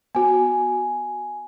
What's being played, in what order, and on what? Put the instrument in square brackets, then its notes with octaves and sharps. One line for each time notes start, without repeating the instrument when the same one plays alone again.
[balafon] B3 F#4 [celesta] G#5